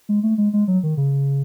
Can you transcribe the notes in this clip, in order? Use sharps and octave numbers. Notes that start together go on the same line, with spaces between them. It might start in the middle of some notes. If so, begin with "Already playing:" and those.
G#3
A3
G#3
G#3
F#3
D#3
C#3